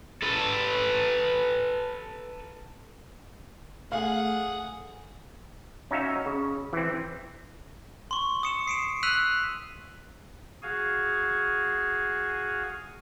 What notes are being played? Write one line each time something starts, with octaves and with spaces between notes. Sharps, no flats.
A4 B4
A3 G#4 F5 F#5
C#4 D#4 F#4 E5 F5
C#3
E3 C4
C6 C#6
D#6 C#7 E7
C7 D7 E7
E6 F#6 B6 D#7 F7 F#7
F#4 G#4 F5 G#5